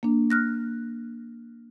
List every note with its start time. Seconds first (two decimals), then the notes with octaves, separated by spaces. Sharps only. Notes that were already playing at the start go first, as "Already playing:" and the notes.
0.03 A#3 D4
0.30 F6 F#6 A#6